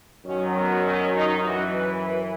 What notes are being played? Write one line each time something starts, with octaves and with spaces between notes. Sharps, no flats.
F#2 D#3 F#3 C#4
B3
C#4
D#4
F#2 E3 F#4
B4
B4